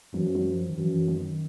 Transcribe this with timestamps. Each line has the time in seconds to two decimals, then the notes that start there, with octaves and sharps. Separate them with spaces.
0.14 F#2 E3
0.24 F3
0.35 F#3
0.45 F3
0.69 D#3
0.76 F#2 E3
1.08 D#3